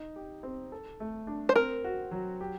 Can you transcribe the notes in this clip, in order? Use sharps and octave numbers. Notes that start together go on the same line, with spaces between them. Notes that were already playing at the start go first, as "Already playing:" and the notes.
Already playing: D#4
G4
C4
A4
A3
D4
C5
C4 A#4
F#4
F#3
G4